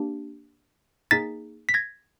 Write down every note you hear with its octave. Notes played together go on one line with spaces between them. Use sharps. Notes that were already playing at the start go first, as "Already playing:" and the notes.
Already playing: A#3 D4 G4
A#3 D#4 G#4 A6 B6
B6
G#6 A#6